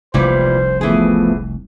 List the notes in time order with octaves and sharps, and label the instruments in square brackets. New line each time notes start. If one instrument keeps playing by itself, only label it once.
[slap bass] F1 C2 [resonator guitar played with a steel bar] A#2 E3 G3 [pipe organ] C5
[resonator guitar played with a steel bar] E3 G#4 [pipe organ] F3 A3 B3